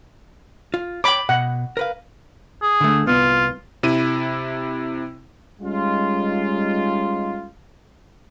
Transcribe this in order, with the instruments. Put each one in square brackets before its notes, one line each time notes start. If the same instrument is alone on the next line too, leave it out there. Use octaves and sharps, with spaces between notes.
[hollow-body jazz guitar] F4
[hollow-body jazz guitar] C#5 G5 [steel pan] B5 D6
[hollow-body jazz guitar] B2 [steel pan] F#5
[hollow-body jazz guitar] A#4 B4 F5
[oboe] G#4
[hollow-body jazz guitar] D3 A3
[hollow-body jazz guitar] C2 B3 [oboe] F4
[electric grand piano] C3 E4 D#7
[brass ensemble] G3 G#3 C#4 D#4 F4